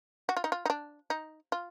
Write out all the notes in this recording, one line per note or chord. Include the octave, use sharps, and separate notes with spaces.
F#4
F4
D#4
F4
D#4
D4
D#4
F4